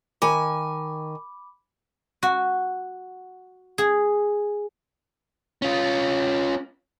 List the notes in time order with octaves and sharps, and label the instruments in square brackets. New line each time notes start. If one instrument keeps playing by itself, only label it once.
[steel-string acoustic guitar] D#3 G#5 [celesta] B5 D6
[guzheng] F#4
G#4
[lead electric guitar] C#4 F4